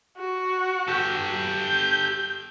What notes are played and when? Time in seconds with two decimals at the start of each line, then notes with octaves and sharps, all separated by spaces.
0.17 F#4
0.88 G4 A4
1.60 G6